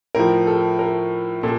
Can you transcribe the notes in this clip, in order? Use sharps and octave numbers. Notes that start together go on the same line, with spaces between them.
A2 F3 A#4
A4
A#4
A#2 A4